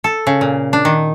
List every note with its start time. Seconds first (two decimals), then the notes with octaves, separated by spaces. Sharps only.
0.04 A4
0.27 C#3
0.41 A#2
0.73 D4
0.85 D#3